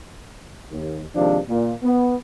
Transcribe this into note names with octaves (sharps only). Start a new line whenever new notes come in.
D#2
D#2 C3 D#3 F3 G#3 D4
A#2
B3